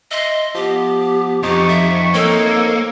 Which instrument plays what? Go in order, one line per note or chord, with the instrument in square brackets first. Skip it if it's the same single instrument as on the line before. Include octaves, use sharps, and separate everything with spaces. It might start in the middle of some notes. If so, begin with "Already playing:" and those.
[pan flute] D#5 [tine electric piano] E5 C6
[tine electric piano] F3 [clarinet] B3 [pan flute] G4
[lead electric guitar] F2 [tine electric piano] D#4 [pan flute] G4 [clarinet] C#6
[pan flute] E5
[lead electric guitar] A#3 [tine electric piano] C4 D#4 [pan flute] A4 [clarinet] C#5